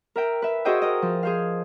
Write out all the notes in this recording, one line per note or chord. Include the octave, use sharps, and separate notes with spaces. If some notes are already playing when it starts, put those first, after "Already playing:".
A#4 E5 G5
B4 E5
F#4 G#4 C5 D#5 G5 E6
A#4 D#5
F3
G#4 C5 F5